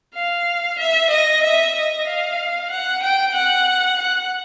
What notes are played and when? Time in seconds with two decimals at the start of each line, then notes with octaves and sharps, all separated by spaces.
0.14 F5
0.78 E5
1.10 D#5
1.42 E5
1.75 D#5
2.07 F5
2.70 F#5
3.02 G5
3.34 F#5
3.98 F#5